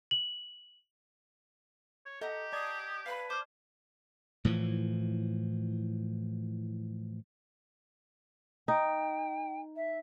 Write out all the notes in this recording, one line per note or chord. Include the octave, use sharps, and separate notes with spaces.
F#7
C#5
G4 A4 D#5 F#5 A#5
D5 A5 D#6 G#6
B4 F5 B5
C5 D6 F6
A2 E3 F3
D#4 G5
E5